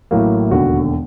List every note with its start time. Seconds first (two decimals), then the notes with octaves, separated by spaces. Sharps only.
0.11 A1 A2 F#3 A#3
0.51 E1 D#2 D3 F#4